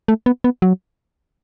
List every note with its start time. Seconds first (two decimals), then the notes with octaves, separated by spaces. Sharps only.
0.08 A3
0.26 B3
0.44 B3
0.62 F#3